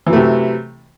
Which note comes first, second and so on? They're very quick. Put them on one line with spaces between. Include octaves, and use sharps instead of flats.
E3 F#3 A3 C3